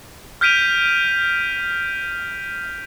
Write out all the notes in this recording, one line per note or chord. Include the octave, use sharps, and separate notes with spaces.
F6 G6 B6 D7 D#7 F7